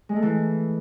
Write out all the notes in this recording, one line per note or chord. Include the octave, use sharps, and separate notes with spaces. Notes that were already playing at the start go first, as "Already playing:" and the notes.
G#3
A3
E3